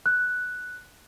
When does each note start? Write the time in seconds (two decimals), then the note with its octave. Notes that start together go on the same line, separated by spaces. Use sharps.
0.06 F#6